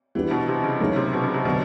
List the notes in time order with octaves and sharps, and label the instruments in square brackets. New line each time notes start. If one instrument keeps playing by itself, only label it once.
[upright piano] E3 [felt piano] G3 B3 D4 G4 B4
[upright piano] B2
C3
C#3
[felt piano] A2 F#3 A#3 D#4 [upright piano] C#3
[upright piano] C3
B2
C#3
C3
[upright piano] B2 [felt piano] D3 F#3 B3